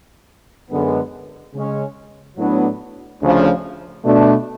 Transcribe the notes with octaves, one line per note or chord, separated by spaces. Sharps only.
F#2 D3 G#3 B3
C#3 G#3 C#4
A2 F#3 B3 D4
D2 C#3 F3
B2 A3 D4